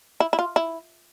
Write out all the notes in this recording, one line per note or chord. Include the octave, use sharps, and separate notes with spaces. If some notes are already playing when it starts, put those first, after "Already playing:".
E4
E4
F4
E4